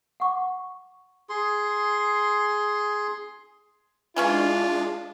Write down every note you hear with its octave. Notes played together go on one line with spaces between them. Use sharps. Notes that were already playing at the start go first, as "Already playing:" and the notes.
F#5 C#6 D6
G#4 C6
E3 G#3 C#4 D4 F4 C#6